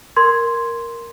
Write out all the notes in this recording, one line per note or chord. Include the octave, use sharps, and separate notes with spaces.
A#4 C6 G#6